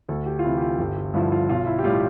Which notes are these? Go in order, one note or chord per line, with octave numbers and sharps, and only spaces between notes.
D2 A4
G4
F4
C3 E3 E4
G4
F4
G1 G4
G4
G2 D3 F3 E4
F4
B1 F4
E4
G4
A2 G3 F4